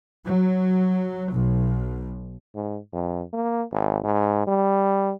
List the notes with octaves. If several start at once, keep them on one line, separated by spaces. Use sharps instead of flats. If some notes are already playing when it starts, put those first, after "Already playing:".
F#3
B1
G#2
F2
A#3
G#1
G#2
G3